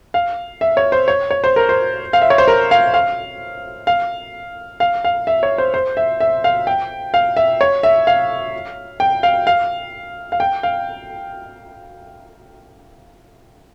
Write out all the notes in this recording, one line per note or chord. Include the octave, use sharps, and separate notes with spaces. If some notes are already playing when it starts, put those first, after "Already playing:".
F5
E5
C#5
C5
C#5
C#5
C5
A#4
C5
F5
E5
C#5
C5
A#4
F5
F5
F5
F5
F5
E5
C#5
C5
C5
E5
E5
F5
G5
F5
E5
C#5
E5
F5
G5
F5
F5
F5
G5
F5